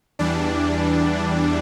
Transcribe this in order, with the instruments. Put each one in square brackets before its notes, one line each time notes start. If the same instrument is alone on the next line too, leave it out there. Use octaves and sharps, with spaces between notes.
[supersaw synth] E2 E3 G3 D4